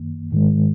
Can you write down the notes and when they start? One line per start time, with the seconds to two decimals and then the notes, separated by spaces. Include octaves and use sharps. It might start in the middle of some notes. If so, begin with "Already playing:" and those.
Already playing: F#2 D#3 A#3
0.32 G#2 D#3 G#3